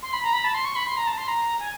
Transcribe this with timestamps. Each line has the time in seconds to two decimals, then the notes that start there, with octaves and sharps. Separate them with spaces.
0.02 C6
0.13 B5
0.23 A#5
0.33 B5
0.44 A5
0.54 C6
0.65 C#6
0.76 B5
0.86 C6
0.97 A#5
1.07 A5
1.17 C6
1.28 A#5
1.60 G#5